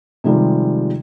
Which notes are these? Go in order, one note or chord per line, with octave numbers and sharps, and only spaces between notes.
C3 D#3 F3 G3 G#3